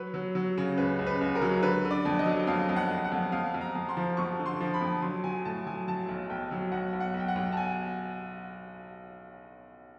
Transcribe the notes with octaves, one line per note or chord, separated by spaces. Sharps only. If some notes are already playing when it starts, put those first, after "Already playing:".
Already playing: F#3 B4
F#3
F#3
C#3
C#2 B4
C#2
B4
C#2
A#4
F#3
D3 B4
D3
D5
F2
D#5
F#3
F2 F5
F2
F#5
F2
F#5
F2
F2 F5
F2
A#5
F2
C6
F3
F2 C#6
D3
C6
F3
B5
F2
F#3 C6
F#3 G#5
A2 A5
F#3 G#5
F#3 A5
B1
B1 G5
F#3
B1 F#5
B1
F#5
B1
G5
F#5
B1
A5
G#5